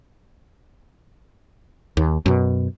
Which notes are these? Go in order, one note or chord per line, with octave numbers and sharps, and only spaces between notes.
D#2
F#2 B2